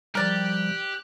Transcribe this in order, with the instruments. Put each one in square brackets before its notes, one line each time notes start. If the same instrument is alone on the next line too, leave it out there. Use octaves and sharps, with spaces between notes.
[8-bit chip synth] F3 G3 [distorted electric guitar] G4 [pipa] A#4 D5 [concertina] F#6